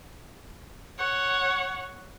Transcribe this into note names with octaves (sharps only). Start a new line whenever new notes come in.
C#5 F#5